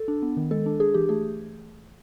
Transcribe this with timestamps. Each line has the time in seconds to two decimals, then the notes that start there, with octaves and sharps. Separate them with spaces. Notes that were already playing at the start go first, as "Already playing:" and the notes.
Already playing: A4
0.08 D4
0.22 B3
0.37 D#3
0.51 G#3 A4
0.66 D4
0.80 D4 G#4
0.94 E3 G4
1.09 A3 G#4